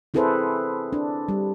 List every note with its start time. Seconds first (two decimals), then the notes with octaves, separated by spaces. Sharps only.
0.14 C4 E4 G#4 A4 B4 C5
0.93 D4
1.28 G3